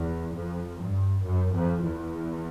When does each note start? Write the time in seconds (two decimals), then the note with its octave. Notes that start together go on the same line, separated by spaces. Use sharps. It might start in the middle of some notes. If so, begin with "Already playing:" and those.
Already playing: E2
0.35 F2
0.79 G2
1.23 F#2
1.53 F2
1.82 E2